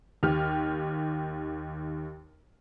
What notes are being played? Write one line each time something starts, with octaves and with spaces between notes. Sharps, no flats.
D#2 G4 F6